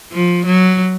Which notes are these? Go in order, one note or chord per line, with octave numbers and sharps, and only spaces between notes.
F3
F#3